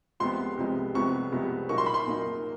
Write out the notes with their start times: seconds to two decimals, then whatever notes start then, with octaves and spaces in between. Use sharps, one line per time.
0.20 C2 C3 F3 G#3 B3 C6
0.57 C2 C3 F3 G#3 B3
0.94 C2 C3 F3 G#3 B3 C#6
1.32 C2 C3 F3 G#3 B3
1.69 A#2 F#3 A#3 D#4 C#6
1.78 C6
1.86 B5
1.94 C6
2.07 A#2 F#3 A#3 D#4